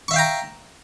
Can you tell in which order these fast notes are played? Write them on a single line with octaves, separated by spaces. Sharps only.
C#6 E5 F5 G5 A#5